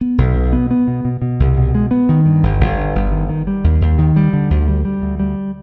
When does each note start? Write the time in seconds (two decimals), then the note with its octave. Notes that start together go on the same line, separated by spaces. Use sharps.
0.01 B3
0.18 B1
0.36 B2
0.53 B3
0.71 B3
0.88 B2
1.05 B2
1.22 B2
1.40 C2
1.57 B2
1.75 G#3
1.91 B3
2.09 D#3
2.26 G2
2.43 G1
2.60 G1
2.78 G2
2.95 G1
3.12 D#3
3.29 D#3
3.47 G3
3.64 D#2
3.81 D#2
3.99 D#3
4.16 G3
4.33 D3
4.50 D2
4.68 G3
4.85 G3
5.02 D2
5.19 G3